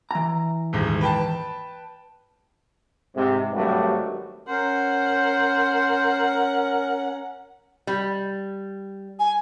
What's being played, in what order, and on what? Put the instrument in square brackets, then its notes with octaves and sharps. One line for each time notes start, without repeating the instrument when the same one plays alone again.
[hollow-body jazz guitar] E3 A#5
[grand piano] D#1 G#2
B4 G5 A5
[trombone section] G#2 C3
G#1 G2 F#3 A3 F#4 G4
[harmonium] C#4 [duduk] A#4 [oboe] C5 [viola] F#5
[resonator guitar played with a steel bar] G3
[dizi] G#5